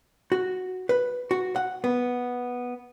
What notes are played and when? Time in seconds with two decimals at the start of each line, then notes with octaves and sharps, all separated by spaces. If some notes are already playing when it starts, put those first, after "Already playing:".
0.32 F#4
0.89 B4
1.31 F#4
1.56 F#5
1.84 B3